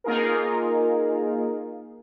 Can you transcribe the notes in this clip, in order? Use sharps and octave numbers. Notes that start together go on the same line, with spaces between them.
A#3 D#4 F4 G#4 A#4